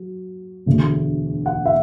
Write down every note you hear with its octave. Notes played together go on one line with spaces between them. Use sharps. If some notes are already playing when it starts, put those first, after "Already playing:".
Already playing: F#3
E1 D2 D3 A3
F#5
E5